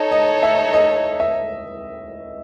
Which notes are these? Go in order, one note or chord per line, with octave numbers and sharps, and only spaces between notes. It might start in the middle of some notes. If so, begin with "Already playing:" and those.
Already playing: D#4 A4 C#5 D#5
D#5
E5
D#5
E5